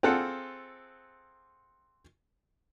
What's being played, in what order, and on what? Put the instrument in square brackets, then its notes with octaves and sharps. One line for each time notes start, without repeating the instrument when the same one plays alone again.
[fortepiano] C4 F4 G#4 A4 F#5